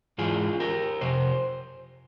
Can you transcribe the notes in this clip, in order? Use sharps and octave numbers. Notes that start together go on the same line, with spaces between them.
G#2 E3 F4 G#4
G4 A#4
F2 C3 C5